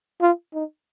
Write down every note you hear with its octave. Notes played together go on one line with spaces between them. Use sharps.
F4
D#4